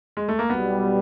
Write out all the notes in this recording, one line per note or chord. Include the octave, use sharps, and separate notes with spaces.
G#3
A3
A#3
B1 B2 G3 B3